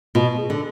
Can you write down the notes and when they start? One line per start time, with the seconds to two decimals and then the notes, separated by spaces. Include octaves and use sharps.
0.15 B2 F4
0.38 G#4
0.50 D3